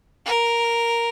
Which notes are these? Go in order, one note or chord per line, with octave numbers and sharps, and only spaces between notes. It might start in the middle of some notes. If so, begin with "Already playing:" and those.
A#4